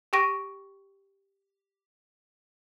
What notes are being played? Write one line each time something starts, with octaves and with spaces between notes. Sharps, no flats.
G4 G5 C#6 A#6 D7 D#7